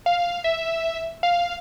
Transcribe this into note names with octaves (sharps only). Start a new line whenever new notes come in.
F5
E5
F5